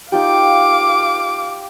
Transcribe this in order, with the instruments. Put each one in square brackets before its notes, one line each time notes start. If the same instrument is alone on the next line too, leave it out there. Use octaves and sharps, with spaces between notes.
[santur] D#4 F4 G4 [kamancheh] F5 D6